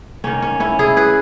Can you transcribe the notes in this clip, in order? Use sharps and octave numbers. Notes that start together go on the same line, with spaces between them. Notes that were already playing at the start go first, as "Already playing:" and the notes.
D#3 A#3 C#4
C#4
C#4 E4
E4 G#4
G#4 B4